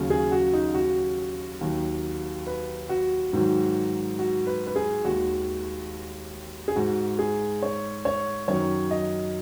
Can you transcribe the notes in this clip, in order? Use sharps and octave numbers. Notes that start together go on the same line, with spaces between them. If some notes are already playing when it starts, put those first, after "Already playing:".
Already playing: D#2 C#3 F#3
G#4
F#4
D#4
F#4
D#2 D#3 F#3
B4
F#4
G#2 D#3 F#3
F#4
B4
B4
G#4
D#2 D#3 G#3 F#4
G#4
G#2 G#3 F#4
G#4
C#5
C#5
F#2 D#3 F#3 C#5
D#5